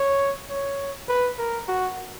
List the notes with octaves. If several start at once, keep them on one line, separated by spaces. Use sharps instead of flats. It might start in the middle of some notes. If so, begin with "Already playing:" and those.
Already playing: C#5
C#5
B4
A#4
F#4